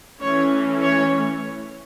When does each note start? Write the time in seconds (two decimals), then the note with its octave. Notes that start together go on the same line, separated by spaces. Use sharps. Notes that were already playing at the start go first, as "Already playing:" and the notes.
0.21 E3 A3 C#4 C#5
0.82 C#5